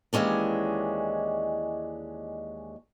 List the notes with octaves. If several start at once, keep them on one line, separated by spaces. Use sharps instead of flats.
D#2 E3 G#3 C#4 D4